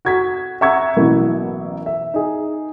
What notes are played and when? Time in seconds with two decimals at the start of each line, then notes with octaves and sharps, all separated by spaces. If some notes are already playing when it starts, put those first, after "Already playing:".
0.05 F#4 G#6 B6
0.61 E5 F#5 A#5 C#6 E6 G#6
0.96 A1 B2 F#3 A#3 E4
1.86 E5
2.14 D#4 G#4